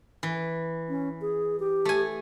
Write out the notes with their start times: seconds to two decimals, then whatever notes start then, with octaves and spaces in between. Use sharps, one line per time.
0.23 E3
0.89 C#4
1.21 G#4
1.60 G4
1.85 A3 G#5